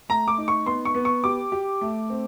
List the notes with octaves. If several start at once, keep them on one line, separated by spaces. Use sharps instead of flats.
A3 A#5
D6
D#4
C#6
B3 C6
C#6
B3
C#6
G4 D6
G4
A3
C4